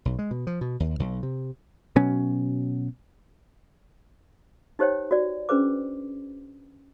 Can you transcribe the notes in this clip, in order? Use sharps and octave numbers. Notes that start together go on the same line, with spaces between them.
B1
G#3
B2
F3
B2
D#2
B1
C3
B2 F#3 C#4
D#4 G4 C5 C#5 G5
F#4 D5
C#4 D4 G#4 B4 C5 D6